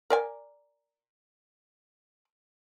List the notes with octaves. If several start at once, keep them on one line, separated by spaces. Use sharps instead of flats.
A#4 D5 G#5